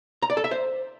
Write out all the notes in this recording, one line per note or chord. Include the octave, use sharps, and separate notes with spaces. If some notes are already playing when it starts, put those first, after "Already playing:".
A#5
D5
A4
E5
C5